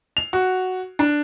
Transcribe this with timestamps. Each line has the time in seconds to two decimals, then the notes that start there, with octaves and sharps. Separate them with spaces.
0.17 F7
0.33 F#4
0.99 D4